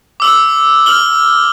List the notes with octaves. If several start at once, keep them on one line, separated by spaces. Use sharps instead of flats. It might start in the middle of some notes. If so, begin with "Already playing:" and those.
D6 E6 F#7
F6 F#7 G7